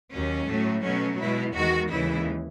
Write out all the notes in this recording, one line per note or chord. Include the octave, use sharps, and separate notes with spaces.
D#2 D#3 F#3 C#4
A2 F#3 A3
B2 F#3 A3 C#4
B2 G#3 E4
E2 D#3 G#3 F#4
D#2 C#3 E3 G#3 E4